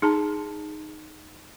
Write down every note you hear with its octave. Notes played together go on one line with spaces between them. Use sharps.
D#4 G#4 A5 A#5